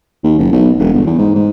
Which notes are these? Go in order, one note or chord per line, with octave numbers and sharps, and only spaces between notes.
D#2
F#1
B1
E1
G1
E2
G#2
G#2